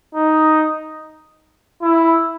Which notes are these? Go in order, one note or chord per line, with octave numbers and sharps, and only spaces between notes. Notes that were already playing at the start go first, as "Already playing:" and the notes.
D#4
E4